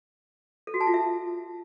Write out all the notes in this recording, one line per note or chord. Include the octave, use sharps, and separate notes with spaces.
A4
F#4
A5
F4
E5